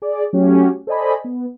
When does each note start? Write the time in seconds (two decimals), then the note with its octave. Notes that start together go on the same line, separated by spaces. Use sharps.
0.02 G#4 D5
0.33 F#3 A3 C#4 F#4 G4
0.87 A4 C5 D5 D#5 G#5 B5
1.24 B3